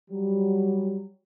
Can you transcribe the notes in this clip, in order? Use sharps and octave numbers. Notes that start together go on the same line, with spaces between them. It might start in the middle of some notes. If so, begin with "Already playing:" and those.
F#3 G3